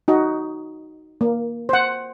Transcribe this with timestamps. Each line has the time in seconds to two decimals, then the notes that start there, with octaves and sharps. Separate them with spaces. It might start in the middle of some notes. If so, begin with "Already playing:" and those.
0.08 D#4 F#4 D#5
1.21 A#3
1.69 C5 F#5